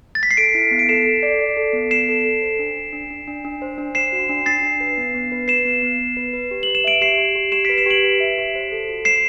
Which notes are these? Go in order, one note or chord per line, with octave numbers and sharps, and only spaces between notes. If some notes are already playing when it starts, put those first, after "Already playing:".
A6
B6
C7
A4 B6 D7
E4
B3
D7
A4 C7 E7
A4
D5
D5
A4
B3
B3 C7 E7
A4
A4
C5
D4
D4
D4
D4
D4
D4
C5
D4
C5 C7 E7
F#4
D4
D4 A6 C7
D4
B4
B3
B3
B4
B4 C7 E7
B3
B3
B3
B4
B4
G4
B4 F#7
E7
E5 D7 F#7
G4 C7 E7
G4
G4
G4 C7 E7
B4 B6 D7
C7 E7
G4 D7 F#7
B4
E5
G4
C5
A4
F#4
C5 C7 E7